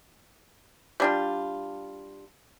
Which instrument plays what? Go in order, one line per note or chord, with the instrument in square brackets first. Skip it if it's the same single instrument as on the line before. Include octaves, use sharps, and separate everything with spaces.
[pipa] G3 D4 F4